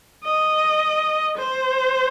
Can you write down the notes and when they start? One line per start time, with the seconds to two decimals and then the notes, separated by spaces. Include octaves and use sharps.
0.24 D#5
1.38 C5